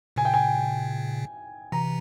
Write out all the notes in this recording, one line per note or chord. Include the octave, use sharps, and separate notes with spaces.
A#2 C#3 G#5
G5
G#5
C3 E3 A#5